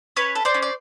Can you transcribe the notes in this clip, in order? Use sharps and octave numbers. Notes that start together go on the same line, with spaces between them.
C#4 B4 C#5
A4
C5 D5
C#4
D5